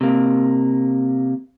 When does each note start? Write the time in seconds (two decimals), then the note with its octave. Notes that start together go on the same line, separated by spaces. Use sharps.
0.01 C3 A#3